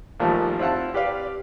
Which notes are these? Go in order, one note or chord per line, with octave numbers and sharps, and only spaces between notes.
A#1 D#3 F3 G3 A3
C4 E4 F4 F#5 A5
G4 B4 D5 F5